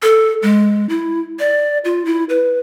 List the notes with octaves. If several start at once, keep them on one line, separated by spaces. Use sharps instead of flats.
A4
G#3
E4
D5
F4
E4
B4